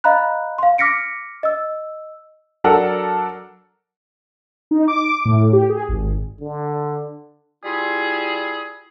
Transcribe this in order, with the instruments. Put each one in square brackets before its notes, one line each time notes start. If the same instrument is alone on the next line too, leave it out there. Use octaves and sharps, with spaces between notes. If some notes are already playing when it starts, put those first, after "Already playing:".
[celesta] D#5 F5 A#5 B5 F#6
F5 C6
D6 F6 A#6 B6 C#7 D7
D#5 E6
[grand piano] F#3 D4 A4 A#4 F#5
[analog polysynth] D#4
D6
A2
G4
G#4
G#1
[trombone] D3
[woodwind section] G3 E4 F4 G#4